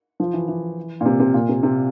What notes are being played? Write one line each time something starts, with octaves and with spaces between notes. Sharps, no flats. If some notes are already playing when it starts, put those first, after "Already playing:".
F3
E3
E3
A#2
C3
C3
A#2
C3
C3